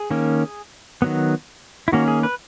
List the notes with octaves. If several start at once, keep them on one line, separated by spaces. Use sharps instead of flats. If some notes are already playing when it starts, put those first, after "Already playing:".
Already playing: G#4
D#3 A#3 C#4
D#3 F#3 B3
E4
D#3 A#3 C#4 F#4
G#4
B4